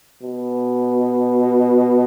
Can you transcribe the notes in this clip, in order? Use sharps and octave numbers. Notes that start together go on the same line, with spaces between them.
B2